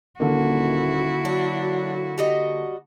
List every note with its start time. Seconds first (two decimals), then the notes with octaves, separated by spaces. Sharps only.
0.20 D#1 D3 A#3 E4 F#4
1.25 F#3 D4
2.18 G3 F#4 D#5